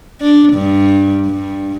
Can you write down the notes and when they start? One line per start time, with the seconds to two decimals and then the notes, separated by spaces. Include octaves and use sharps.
0.21 D4
0.53 G2
1.26 G2